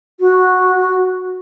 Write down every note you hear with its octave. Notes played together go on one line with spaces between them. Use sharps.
F#4